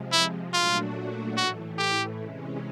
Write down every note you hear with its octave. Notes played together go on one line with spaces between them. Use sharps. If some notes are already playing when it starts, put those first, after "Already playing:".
Already playing: C3 F3 G#3
E4
A#2 F#3 A3 D4 F4 F#4
A2 E3 A3 F#4
G4
C3 E3 G#3 C#4